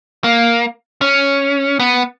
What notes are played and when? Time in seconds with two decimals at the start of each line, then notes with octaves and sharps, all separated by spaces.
0.24 A#3
1.01 C#4
1.80 B3